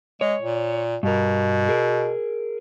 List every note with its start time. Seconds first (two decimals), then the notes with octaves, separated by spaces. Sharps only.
0.21 G#3 C#5
0.42 A#2
1.03 G2 B2 A#4
1.69 G#4 A#4